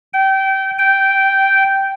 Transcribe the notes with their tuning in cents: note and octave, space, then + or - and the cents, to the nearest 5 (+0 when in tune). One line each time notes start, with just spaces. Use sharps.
G5 -25
G5 -10